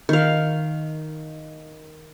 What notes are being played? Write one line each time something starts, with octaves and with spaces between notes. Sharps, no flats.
D#3 F5